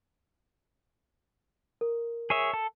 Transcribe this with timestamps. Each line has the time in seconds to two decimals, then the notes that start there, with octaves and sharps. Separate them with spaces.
1.81 A#4
2.30 G#4 C#5 E5
2.54 A4